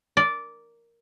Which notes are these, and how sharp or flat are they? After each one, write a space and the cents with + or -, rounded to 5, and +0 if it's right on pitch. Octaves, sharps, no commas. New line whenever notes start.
A#4 +0 D5 -10